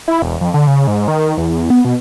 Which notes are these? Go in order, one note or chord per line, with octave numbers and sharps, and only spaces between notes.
E4
E1
F2
D3
C#3
G#2
D#3
E2
B3
B2